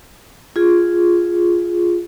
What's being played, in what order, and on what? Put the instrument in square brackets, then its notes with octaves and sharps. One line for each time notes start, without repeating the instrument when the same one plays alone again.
[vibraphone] F4 G#4